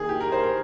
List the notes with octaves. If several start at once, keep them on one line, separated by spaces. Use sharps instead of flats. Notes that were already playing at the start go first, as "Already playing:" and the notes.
Already playing: D#3 A#3 G#4
G4
A#4
C5
A#4